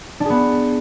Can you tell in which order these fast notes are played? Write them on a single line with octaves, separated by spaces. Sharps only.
D4 G#4 B3